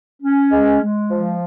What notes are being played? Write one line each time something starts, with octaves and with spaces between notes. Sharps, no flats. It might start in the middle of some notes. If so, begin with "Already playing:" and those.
C#4
G#3
G#3
F3